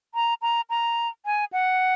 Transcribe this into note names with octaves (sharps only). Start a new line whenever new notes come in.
A#5
A#5
A#5
G#5
F#5